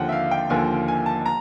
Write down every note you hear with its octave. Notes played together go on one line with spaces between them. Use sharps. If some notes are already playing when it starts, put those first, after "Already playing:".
Already playing: D#2 D3 F3 A#3 F#5 G5
E5
F5
G5
D#2 D3 F3 A#3 G#5
G#5
A5
A#5